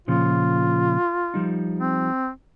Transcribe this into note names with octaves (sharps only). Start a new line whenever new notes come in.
A#2 C#3 F3 F4
F3 G3 D#4
C4